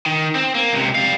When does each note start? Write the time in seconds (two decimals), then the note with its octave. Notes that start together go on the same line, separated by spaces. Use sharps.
0.06 D#3
0.35 C4
0.55 A#3
0.73 C#2 C3
0.95 G3 F5